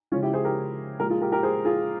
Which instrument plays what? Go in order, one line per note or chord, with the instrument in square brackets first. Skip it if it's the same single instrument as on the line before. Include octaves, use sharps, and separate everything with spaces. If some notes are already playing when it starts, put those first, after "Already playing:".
[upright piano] C#3 F3 G#3 C#4 F4
E4 G4
G#4 C5
G4 A#4
A#2 F3 G#3 G4 A#4
F4 G#4
G4 A#4
G4 A#4
G#4 C5
F4 G#4